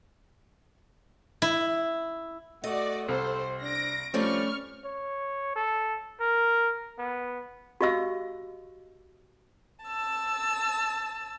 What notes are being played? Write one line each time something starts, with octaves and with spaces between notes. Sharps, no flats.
E4
A3 F#4 D5 D#5
C2 A4 C5
D4 A#6 D7
F3 G3 A3 C4 C#4 D5 C#6 F6
C#5
A4
A#4
B3
F#4 G4 D#5 F5 E6
A5 E6